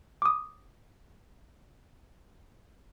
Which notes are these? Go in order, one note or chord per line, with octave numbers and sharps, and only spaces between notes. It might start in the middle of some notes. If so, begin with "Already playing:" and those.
D6 D#6